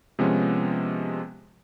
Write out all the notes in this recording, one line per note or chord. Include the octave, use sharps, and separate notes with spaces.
C3 F3 G#3 B3 C#4